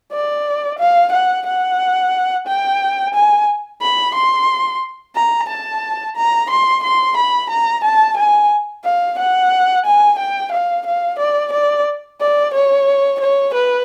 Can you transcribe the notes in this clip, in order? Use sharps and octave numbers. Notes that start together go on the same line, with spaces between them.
D5
F5
F#5
F#5
G5
G#5
B5
C6
A#5
A5
A#5
C6
C6
B5
A#5
A5
G#5
F5
F#5
G#5
G5
F5
F5
D5
D5
D5
C#5
C#5
B4